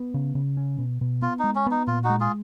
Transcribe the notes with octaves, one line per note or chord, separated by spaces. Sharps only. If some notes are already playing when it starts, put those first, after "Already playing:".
Already playing: B3
C#3
C#3
C#4
B2
B2
B3 F4
G#3 D#4
C#4
B3 D#4
A#2 F4
D#4 F#4
G#3
F4 G#4